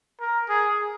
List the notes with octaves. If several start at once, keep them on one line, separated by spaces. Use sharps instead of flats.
A#4
G#4